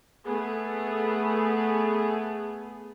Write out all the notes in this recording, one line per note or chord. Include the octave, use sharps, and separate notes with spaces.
A3 B3 G#4